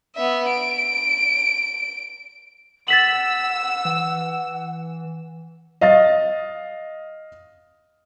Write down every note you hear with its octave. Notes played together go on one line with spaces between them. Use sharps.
B3 E5
D7
F#5 E6 A6 B6 F#7
E3
D#5 F5 D#6 A6